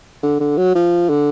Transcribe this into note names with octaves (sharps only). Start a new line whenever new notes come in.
D3
D3
F#3
F3
D3